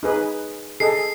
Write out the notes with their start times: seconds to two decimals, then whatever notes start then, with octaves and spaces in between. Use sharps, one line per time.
0.03 D#4 G#4 B4
0.80 G#4 A4 D#5 C7